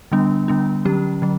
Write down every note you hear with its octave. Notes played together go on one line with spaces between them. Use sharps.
D3 G3 B3 D4
D3 G3 B3 D4
D3 F#3 C#4 G4
D3 F#3